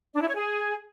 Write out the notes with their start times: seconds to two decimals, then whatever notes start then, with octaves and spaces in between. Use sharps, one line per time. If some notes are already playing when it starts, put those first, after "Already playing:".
0.15 D4
0.21 E4
0.28 C#5
0.35 G#4